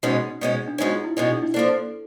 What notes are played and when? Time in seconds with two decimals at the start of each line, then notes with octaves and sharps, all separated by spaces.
0.03 B2 G#3 C#4 D#4
0.41 B2 G#3 C#4
0.68 D4
0.78 B2 G#3 C#4 D#4
0.92 F4
1.04 E4
1.16 B2 G#3 C#4 D#4
1.29 D4
1.42 E4
1.54 F3 A#3 D4 A4